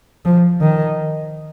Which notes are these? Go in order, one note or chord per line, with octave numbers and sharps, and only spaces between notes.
F3
D#3